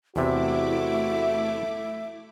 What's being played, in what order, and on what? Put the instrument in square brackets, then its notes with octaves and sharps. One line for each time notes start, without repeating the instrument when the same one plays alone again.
[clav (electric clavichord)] E2 C3 [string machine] A3 E4 D6 [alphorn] F#4 [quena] E5